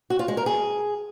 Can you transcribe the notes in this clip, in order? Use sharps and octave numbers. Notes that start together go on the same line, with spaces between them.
F#4
F4
G#3
A#4
G#4